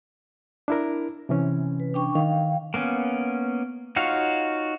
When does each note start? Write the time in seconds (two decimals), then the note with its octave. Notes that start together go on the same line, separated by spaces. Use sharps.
0.68 D4 E4 A#4
1.29 C3 E3 C#4
1.80 B4
1.94 D4 G5 C#6
2.15 D#3 F5 G5
2.74 A#3 B3 C#4
3.96 D#4 F4 F#4 C#5 F5